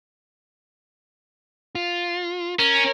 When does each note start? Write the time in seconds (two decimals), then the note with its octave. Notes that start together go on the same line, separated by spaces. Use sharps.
1.75 F4
2.59 C#4 A#4